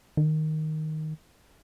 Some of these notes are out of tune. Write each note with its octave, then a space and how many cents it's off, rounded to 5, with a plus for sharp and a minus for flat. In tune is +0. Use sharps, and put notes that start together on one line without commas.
D#3 +0